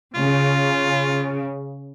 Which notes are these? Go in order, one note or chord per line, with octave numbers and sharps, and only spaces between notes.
C#3 F4